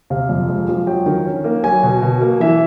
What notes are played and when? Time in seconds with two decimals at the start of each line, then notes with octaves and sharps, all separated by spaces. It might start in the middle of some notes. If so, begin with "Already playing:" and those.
0.10 C3 F5
0.29 F2
0.48 G#3
0.69 F3
0.87 F#3 G5
1.06 D#3
1.26 C#4
1.44 A#3
1.63 F#3 G#5
1.83 B2
2.02 B2
2.21 A#3
2.40 E3 E5